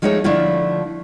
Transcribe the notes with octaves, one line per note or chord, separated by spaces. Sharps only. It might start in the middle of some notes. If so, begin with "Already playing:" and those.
F3 G#3 A3 D#4 A4 C#5
D3 F3 A3 E4 F4